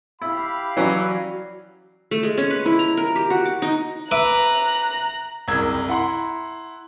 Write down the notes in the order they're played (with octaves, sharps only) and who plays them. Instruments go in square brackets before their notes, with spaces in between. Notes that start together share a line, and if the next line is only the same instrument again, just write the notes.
[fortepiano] E4 [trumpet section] G4 F5 B5
[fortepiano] E3 C#4 [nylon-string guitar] F#3 D5
[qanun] A3
G#3
C#4
B4
E4
A#5
A#4
G4
F#4
D6
D#4
[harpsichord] B4 E5 D6 [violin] A#5 F#6
[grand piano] F#1 C2 A#4 E6 G#6
E4 F#5 A#5 C6